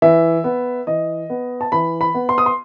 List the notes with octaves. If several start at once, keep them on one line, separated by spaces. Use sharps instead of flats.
E3 E5
B3
E3 D#5
B3
A5
E3 B5
B5
B3
C6
D#6
C6